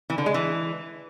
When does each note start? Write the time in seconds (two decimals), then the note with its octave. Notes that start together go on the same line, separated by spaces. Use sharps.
0.10 E3
0.18 D3
0.26 G#3
0.34 E3